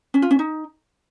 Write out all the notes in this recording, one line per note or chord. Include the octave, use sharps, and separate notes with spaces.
C#4
F4
C#4
D#4